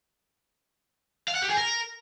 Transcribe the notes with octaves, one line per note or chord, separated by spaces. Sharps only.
F5
F#5
G4
G#4
A#4